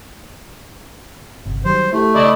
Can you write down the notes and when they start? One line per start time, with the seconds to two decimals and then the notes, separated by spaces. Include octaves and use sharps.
1.46 G1 C3
1.65 D#3 F#3 G3 C5
1.93 A3 E4 G4 A4
2.15 C#3 E4 D5 D#5 A6